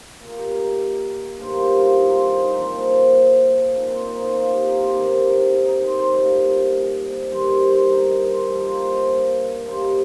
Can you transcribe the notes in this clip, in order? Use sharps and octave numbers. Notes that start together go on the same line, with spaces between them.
A#2 A#3
A#4
G4
A#4
D#5
G2 D#3 A#3 C5
F4
G4
F4
D#4
C4
C4
D#4
A#2 F3 A#3 C4
A#2 A#3 D#4
C4
D#4
F4
F4
G4
A#4
C4
C3 D#3 A#3
D#4
D#4
C5
C5
A#2 G3 A#3 D#5
G2 D#3 G3 C5
D#5
C5
A#4
D#5
C5
G2 F3 A#3 A#4
C5
C5
D#5
G2 G3 A#3 C5
D#5